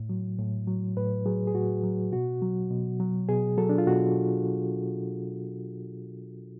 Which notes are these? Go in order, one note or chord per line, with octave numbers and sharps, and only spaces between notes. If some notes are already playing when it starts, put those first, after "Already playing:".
Already playing: A2
F#3
A2
F#3
A2 B4
F#3 G#4
G#4
A2 F#4
F#3
B2 F#4
F#3
B2
F#3
B2 G#4
F#3 A4
D4
F4
B2 F#4